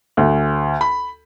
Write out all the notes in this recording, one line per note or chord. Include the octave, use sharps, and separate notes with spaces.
D2
B5